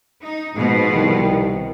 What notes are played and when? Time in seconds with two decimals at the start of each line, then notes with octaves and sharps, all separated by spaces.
0.24 D#4
0.56 G#2 B2 F3
0.91 C2 D#3